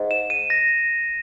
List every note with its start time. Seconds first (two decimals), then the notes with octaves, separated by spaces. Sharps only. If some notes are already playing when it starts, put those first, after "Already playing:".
Already playing: G#2
0.11 E7
0.30 D#7
0.50 A#6